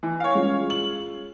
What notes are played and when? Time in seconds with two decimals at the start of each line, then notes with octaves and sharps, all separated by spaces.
0.03 E3
0.20 C#5 F5
0.34 G#3 C#4 F4
0.70 F#7